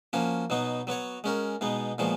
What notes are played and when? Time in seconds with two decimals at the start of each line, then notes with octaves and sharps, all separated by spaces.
0.13 F3 A#3 C#4 F#4
0.50 B2 F#3 B3 D#4 F#4
0.87 F#3 B3 F#4 C#5
1.24 G#3 C#4 F#4 A#4
1.61 B2 G#3 B3 D#4
1.98 A#2 F3 G#3 B3 F#4